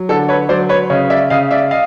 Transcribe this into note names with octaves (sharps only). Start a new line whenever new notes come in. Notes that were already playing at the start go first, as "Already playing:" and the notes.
Already playing: F#3
D3 A4
B4 C#5
F#3 C5 D5
B4 C#5
C#3 C#5 D#5
D5 E5
C#3 D#5 F5
D5 E5
D#5 F5